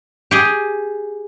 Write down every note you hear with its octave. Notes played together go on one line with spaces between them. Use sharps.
G4 G#4